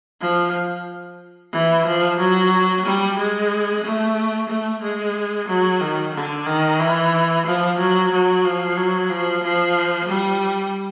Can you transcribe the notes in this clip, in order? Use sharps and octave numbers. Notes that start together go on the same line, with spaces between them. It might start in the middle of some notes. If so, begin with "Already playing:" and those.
F3
E3
F3
F#3
G3
G#3
A3
A3
G#3
F#3
D#3
D3
D#3
E3
F3
F#3
F#3
F3
F#3
F3
F3
G3